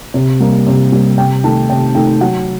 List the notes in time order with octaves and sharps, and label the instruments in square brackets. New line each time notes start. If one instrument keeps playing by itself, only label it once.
[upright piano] C3
G3 A#3
C3
G3 A#3
C3 G5
D#3 A3 D#4 A5
C3 G5
D#3 A3 D#4 G5
F#3 F#5